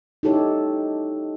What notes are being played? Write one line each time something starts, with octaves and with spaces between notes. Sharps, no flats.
D#4 E4 G4 A4 C#5